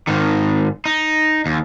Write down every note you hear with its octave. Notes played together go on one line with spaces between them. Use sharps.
G#2 D#3
D#4
D#2